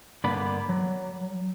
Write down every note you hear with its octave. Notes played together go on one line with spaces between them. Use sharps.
G2 D3 A#3 B3 D5 B5
F#3